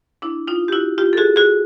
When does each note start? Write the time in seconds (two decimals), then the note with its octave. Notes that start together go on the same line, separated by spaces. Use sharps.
0.22 D4 E4
0.47 D#4 F4
0.68 G4
0.73 E4 F#4
0.98 F4 G4
1.13 A4
1.17 F#4 G#4
1.36 F#4 G#4